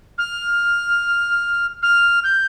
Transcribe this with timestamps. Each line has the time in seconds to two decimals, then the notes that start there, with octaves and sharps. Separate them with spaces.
0.18 F6
1.82 F6
2.24 G6